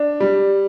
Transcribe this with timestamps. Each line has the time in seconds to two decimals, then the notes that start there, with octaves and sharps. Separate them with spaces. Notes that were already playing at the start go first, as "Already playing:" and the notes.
Already playing: D4
0.20 G3